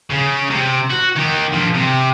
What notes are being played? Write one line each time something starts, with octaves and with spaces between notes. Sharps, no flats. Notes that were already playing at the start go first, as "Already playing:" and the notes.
C#3
C3
F#4
D#3 G4
A#2 F3
C3